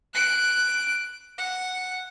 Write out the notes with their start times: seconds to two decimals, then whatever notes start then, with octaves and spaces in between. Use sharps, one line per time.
0.14 F#6 D7
1.38 F#5